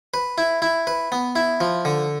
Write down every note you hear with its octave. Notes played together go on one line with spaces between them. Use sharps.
B4
E4
E4
B4
B3
E4
F3
D3